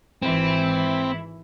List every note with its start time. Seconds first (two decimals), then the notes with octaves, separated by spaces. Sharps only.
0.22 G#1 E3 C4 E4